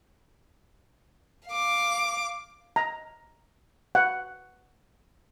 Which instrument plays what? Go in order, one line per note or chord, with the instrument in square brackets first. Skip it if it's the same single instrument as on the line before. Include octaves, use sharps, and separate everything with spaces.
[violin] F5 D6
[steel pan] A#5
F#5